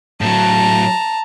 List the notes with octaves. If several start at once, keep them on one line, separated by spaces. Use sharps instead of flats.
A2 F#3 A5 A#5